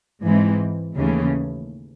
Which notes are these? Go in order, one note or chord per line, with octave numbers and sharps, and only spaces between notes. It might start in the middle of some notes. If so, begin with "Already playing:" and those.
G#2 E3 G#3 C4
D#2 C#3 E3 A3 C#4